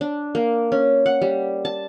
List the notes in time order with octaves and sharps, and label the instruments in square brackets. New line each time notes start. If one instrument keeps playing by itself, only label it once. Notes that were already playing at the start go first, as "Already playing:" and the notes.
[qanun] D4
A#3
C#4
F#5
G3
A5